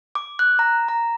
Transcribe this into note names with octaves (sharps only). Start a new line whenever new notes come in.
D6
F#6
A#5
A#5